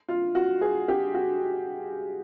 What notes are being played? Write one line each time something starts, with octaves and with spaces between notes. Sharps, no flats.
F4
F#4
G#4
G4
F#4